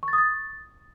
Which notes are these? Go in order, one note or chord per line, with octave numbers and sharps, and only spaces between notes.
C#6
A6
D#6
A6